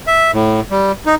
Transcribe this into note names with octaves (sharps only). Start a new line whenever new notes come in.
E5
A2
G3
D#4